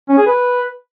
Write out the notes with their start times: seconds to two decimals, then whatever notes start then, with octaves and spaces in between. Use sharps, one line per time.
0.09 C#4
0.18 G#4
0.27 B4